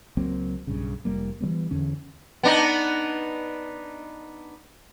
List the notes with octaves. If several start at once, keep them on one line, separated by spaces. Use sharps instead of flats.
C#2 F#3 A#3 C4
B1 G2 C#3
F1 G3 A#3
E3 F#3 G3 B3
E2 D3 C#4
B3 D4 D#4